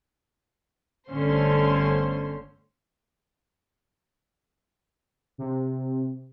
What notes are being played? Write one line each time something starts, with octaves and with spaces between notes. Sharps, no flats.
G1 D3 A3 C#4 C5 C6
C3